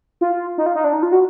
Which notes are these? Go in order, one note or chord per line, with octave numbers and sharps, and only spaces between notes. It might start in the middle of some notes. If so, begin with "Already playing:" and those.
F4
D#4
F4
D#4
D4
D#4
F4
F#4